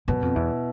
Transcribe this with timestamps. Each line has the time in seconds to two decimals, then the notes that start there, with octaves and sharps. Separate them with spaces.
0.08 F#2 B2
0.22 F2
0.35 E2 E4